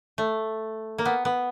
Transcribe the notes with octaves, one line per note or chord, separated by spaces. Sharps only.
A3
A#3
B3
B3